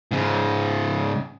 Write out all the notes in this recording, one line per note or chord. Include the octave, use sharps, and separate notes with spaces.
G#2 C#3